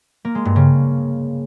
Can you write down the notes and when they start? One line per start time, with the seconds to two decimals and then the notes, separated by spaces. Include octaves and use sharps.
0.25 A#3
0.35 G#3
0.45 G2
0.56 C#3